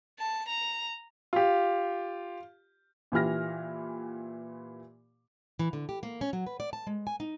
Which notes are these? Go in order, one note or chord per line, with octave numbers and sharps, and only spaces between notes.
A5
A#5
F4 G4
A#2 E3 G4 F6 A#6
E3
D3
G4
A#3
C#4
F#3
B4
D5
A5
G#3
G#5
D#4